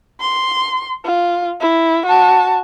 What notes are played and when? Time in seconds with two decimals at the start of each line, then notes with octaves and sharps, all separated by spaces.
0.20 C6
1.05 F4
1.61 E4
2.06 F#4 A5